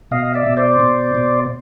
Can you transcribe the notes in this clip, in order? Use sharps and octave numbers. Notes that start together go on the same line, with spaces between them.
B2 D#5 F5
D5 E5
B2
C5 D5
B2
B2